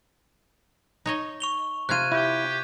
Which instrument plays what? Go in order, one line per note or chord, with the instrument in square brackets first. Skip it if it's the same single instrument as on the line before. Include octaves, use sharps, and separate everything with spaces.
[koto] D#4 C#5 D#5
[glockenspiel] C#6 F7 G7
[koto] C3 F4 [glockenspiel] F#6 G#6 D#7
[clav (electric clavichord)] E4 [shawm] G4